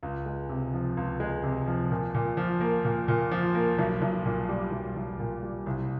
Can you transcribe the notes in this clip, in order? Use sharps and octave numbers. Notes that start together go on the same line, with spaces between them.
C#2
G#3
C3
F3
C#2
G#3
C3
F3
A#2
A#2
F3
A#3
A#2
A#2
F3
A#3
B1
B1
A#2
G3
B1
B1
A#2
G3
C2